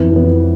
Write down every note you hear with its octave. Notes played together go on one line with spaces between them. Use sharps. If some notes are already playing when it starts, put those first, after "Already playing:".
Already playing: F2 E3 B3
F2 E3 B3